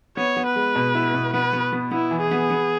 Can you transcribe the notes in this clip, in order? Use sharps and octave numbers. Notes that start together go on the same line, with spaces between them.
B3 C#5
B3
B4
G#3
B2
E4
B2
B3 B4
B3
B3
B3 E4
E3
G#4
B3
B3